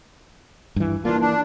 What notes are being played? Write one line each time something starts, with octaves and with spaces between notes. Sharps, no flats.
G2 E3
E3 A#3 D4 F4
D4